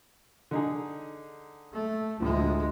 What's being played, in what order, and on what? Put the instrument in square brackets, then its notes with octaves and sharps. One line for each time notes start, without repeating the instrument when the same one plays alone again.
[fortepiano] D3 D#4 G#4
[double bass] A3
[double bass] D2 G#3 [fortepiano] A2 F3